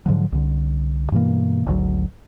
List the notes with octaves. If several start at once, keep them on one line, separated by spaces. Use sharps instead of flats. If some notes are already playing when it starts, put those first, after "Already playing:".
G#2 D3 F3 F#3
C2 D3
G2 B2 E3 A#3
G#1 D2 C#3 F#3